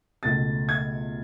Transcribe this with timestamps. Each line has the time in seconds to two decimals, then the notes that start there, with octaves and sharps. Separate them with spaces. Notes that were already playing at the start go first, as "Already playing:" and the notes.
0.23 C#2 B2 A3 A6
0.69 G#6